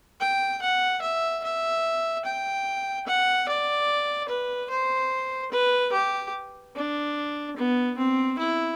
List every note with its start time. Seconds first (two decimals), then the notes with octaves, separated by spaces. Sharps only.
0.20 G5
0.62 F#5
1.02 E5
1.44 E5
2.25 G5
3.07 F#5
3.48 D5
4.29 B4
4.70 C5
5.52 B4
5.93 G4
6.75 D4
7.56 B3
7.97 C4
8.38 E4